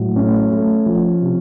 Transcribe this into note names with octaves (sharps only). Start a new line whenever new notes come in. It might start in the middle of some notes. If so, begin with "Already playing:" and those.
Already playing: A2 F#3
A3 C#4
A3
F3
C3